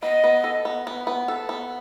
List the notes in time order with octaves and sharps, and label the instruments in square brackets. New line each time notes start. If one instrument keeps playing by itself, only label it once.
[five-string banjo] B3 [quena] D#5
[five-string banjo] B3
A4
B3
B3
B3
A4
B3